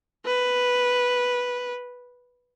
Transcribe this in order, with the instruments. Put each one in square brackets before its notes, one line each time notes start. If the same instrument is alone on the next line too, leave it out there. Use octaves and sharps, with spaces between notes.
[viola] B4